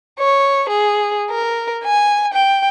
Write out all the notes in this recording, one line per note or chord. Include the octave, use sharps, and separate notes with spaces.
C#5
G#4
A#4
G#5
G5